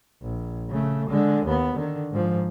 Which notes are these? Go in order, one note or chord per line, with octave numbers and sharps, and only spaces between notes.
A#1
C#3 A3
D3 G#3
D#2 B3
D3 D#3
G#2 F3